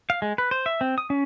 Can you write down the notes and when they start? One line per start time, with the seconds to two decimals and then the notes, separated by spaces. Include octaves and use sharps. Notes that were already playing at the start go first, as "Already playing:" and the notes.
0.10 F5
0.22 G#3
0.38 B4
0.51 C5
0.66 E5
0.81 C4
0.98 D#6
1.10 C#4